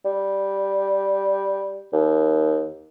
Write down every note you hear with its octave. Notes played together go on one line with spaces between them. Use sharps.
G3
D#2